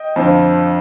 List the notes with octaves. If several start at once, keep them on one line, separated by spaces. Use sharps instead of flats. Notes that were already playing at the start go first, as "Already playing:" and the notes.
Already playing: D#5 G5
F2 D3 F3